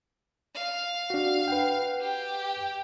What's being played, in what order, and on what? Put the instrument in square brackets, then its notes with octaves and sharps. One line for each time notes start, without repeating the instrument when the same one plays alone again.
[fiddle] F5
[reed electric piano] D4 F#4
B4 F#5 G5
[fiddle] G4